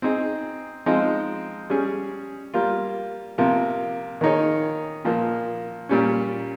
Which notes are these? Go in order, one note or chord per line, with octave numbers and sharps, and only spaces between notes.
C4 D#4 G#4
F3 G#3 C4 D#4
G3 C#4 G#4
G3 A#3 F4
C3 F3 A#3 F4
D#3 A#3 D#4 G#4 C#5
A#2 F3 A#3
A#2 G3 C#4